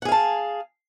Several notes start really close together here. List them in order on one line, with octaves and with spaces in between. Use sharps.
F#5 G#4 F5 A5